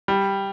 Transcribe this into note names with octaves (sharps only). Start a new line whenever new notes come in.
G3